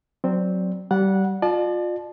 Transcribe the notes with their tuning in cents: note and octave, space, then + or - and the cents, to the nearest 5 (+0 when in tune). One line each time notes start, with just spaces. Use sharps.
F#3 +0 C4 +0 D5 +0
G3 -25 D5 -20 F#5 -10
F4 +25 D5 +40 A5 -30